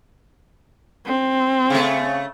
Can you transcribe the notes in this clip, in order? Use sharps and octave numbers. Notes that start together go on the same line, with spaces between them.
C4
C#3 A3